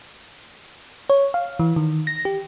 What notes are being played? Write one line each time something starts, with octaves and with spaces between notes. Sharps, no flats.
C#5
F5
E3
D#3
A#6
G4